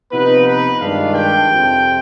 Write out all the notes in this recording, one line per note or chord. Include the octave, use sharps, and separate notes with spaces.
C3 F3 B3 D#4 B4
B4
G2 D#3 G#3 D4 F4 F5
G5
F2 C3 F3